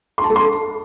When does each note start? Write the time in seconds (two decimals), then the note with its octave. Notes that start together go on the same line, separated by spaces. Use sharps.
0.18 C6
0.24 A5
0.30 A4
0.36 C6